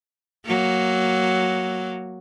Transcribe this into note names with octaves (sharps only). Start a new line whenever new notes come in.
F#3 A#3